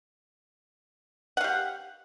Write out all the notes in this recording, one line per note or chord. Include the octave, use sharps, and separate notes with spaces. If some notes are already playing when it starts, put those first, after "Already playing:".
G4 F5 F#5